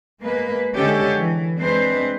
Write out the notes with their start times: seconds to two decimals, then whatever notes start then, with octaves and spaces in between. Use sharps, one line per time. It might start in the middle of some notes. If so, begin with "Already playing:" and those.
0.20 G#3 A#3 B4
0.74 D3 G#3 C#4 G4 A4
1.18 E3
1.58 G#3 C4 D4 B4 C5